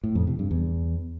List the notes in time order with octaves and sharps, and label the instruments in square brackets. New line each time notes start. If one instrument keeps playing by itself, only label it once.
[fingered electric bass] A2
F2
C3
G2
E2